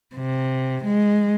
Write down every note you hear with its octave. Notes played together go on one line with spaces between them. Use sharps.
C3
G#3